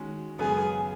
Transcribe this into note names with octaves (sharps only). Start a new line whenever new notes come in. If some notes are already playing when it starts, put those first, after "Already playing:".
Already playing: D#3 G#3 C#4 F#4
F#2 C#3 G#3 B3 G#4